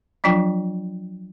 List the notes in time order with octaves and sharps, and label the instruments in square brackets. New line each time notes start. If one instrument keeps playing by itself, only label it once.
[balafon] F3 F#3 D4 F4 G5